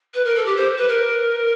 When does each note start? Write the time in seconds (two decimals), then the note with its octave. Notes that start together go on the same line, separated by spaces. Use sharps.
0.14 B4
0.24 A#4
0.35 A4
0.45 G4
0.56 C5
0.77 B4
0.88 A#4